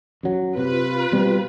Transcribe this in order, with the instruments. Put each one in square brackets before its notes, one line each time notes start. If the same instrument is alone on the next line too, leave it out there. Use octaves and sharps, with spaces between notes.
[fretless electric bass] F#2 F#3
[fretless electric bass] C3 [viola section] F4 B4
[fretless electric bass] B2 G3 C4